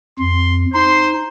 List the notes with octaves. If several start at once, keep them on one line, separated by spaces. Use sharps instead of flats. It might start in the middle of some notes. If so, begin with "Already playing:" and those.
F2 C6
D#4 C5 C6